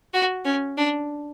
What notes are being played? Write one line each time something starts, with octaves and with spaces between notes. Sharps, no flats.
F#4
C#4
D4